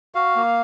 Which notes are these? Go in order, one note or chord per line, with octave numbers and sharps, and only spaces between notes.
F#4 F5
A#3